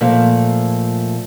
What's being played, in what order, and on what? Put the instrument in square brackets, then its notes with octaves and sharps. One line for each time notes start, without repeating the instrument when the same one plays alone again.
[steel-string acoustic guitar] A#2 F3 A3